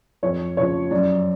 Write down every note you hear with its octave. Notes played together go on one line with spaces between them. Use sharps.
F2 C#5
C#3 F3 C#5
F#2 D5